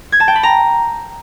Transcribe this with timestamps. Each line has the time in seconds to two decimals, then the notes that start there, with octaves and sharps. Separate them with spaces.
0.12 G#6
0.20 A5
0.28 G5
0.36 B5
0.43 A#5